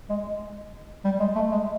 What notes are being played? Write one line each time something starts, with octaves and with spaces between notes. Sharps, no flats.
G#3
G3
G#3
A3
G#3